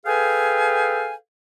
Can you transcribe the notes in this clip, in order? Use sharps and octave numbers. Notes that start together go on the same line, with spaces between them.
G#4 A4 B4 F5 G5 G#5